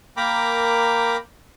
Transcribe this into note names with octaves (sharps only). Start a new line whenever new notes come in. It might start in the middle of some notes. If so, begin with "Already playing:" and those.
A#3 A#4 G5 A#5 B5 D6